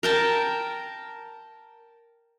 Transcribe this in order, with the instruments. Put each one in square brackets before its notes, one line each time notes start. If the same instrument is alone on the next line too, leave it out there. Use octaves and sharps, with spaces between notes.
[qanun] A#4 G5 A5